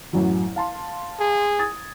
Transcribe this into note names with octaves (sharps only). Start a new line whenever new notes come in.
A1 F#2 F#3
F5 A5 C6
G#4
D#6 G#6 A6